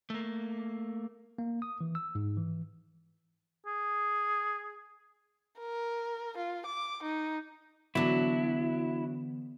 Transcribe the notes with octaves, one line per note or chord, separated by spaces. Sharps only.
A3 A#3
A#3
D#6
E3
E6
G#2
E3
G#4
A#4
F4
D6
D#4
D3 E3 F#3 B3 D4 E4